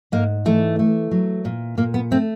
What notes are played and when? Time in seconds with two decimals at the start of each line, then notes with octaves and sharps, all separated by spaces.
0.12 G#2 A#3
0.45 E3 A3
0.79 A3
1.11 F#3
1.45 A#2
1.78 A#2 A#3
1.94 B3
2.11 A3 C4